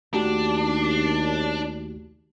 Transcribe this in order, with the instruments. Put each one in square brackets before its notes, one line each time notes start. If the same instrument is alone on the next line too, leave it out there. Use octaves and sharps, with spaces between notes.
[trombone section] D#2 [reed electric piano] A3 F#4 G4 [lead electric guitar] D4